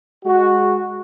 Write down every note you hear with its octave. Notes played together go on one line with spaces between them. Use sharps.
G#3 F#4